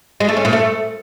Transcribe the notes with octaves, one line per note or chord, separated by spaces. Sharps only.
G#3
A3
C#4
A#2
A3